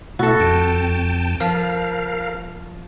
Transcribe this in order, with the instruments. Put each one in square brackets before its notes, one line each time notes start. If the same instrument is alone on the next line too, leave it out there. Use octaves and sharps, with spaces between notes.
[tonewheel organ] B2 A3 E4 [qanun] F#4 A4
[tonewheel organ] F2 G5 A5
[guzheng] F3 [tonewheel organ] A#4 F5